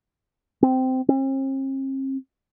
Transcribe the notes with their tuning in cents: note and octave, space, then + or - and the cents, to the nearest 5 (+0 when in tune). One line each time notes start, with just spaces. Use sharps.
C4 -15
C4 +45